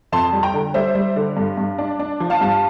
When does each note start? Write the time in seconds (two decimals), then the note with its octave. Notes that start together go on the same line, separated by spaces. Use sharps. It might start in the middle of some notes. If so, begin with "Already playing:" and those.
0.12 F2 A5 C6
0.33 G3
0.43 G5 A#5
0.54 D3
0.74 G3 C5 E5
0.95 G3
1.16 D3
1.37 G2
1.58 G2
1.78 D4
2.00 D4
2.20 F3
2.30 F5 A5
2.41 G2